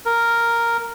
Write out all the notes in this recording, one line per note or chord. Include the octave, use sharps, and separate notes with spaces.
A#4